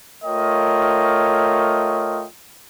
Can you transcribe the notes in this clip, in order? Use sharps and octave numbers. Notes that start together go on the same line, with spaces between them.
A3 F4 A#4 C#5 D#5 G5